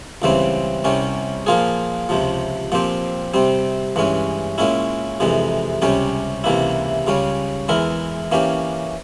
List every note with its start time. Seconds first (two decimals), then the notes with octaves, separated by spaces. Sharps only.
0.22 C#2 C#3 E3 G3 C4
0.84 C2 C3 G3 C#4
1.46 A#2 F3 A#3 F4 G#4
2.09 C#2 C3 F3
2.72 A#2 F3 C4 G4
3.34 C3 G3 C4
3.96 G2 E3 G#3 C#4
4.58 A#2 G#3 C#4 E4
5.20 F2 C3 E3 G#3
5.82 C#2 C3 G3 C#4 G4
6.44 C#2 C3 E3 A#3 E4
7.07 C#2 C#3 G3 C#4
7.68 E2 E3 G#3 E4 A#4
8.32 E3 A#3 C#4 G4